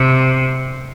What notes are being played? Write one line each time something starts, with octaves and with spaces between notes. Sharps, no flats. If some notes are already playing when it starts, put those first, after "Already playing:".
Already playing: C3